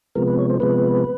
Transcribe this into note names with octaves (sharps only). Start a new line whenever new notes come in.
C3 F3 G#3 B3 A#4
B4
C#5
C5
C3 F3 G#3 B3 B4